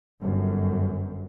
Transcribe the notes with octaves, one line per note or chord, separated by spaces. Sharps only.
G1 F#2